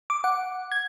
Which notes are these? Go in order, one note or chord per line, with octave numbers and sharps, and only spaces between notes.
D6
F#5
G#6